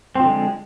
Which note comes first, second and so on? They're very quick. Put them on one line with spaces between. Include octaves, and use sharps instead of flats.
C4 F3 D3 G#3